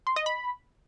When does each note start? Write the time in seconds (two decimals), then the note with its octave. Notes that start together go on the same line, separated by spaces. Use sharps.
0.07 C6
0.16 D#5
0.26 B5